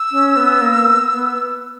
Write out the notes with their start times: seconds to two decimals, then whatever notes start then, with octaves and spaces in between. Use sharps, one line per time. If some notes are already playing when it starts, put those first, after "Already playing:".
Already playing: E6
0.12 C#4
0.36 B3
0.61 A#3
0.85 B3
1.11 B3